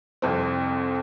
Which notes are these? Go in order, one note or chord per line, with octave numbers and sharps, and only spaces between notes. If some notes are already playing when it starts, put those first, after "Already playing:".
C2 F2 C4